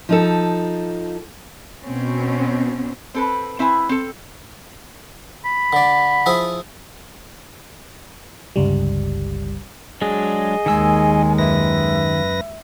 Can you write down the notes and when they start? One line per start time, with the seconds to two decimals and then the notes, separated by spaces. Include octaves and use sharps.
0.09 F3 D#4 A4
1.82 B2 C4 C#4
3.14 C4 A4 B4
3.59 C4 E4 B4 G#5
3.89 C4 A4
5.45 B5
5.73 D3 D5
6.26 F3 E4 G#4
8.56 G1 C#2 G3
10.01 F#3 G#3 D4 G#4 D#5
10.66 D#2 D#3 G#3 G#5 E6
11.38 F#2 B4 E5 A#6